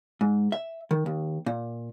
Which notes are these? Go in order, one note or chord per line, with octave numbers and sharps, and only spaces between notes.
G#2
E5
D#3
D#2
A#2